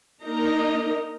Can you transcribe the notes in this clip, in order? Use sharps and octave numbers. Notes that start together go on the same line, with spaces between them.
A#3 D4 D#4 A#4 D#5 A#5